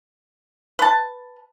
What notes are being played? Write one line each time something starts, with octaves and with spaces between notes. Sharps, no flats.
B4 A5